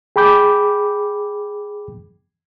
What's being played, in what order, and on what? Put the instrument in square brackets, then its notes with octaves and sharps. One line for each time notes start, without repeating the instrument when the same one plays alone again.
[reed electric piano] G#4 G5 B5 D6 G6